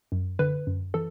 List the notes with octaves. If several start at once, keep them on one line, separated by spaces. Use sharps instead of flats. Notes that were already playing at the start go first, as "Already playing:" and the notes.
F#2
D3 B4
F#2
E3 A4